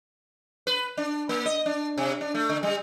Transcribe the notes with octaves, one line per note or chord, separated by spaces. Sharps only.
B4
D4
A#3
D#5
D4
C3
D4
A3
D3
G3